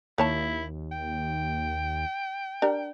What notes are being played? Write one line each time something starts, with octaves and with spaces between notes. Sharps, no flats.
D#2 A#3 E4 C#5 A5
G5
D4 G4 A#4